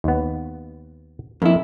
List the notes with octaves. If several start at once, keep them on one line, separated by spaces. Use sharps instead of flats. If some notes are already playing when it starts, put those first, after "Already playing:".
D#2 B3
F2 A#3 E4